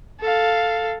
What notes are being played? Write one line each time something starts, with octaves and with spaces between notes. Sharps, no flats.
A4 F5